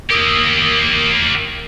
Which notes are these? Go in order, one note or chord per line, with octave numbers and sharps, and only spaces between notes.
A#3 G4 A#4 D#6 E6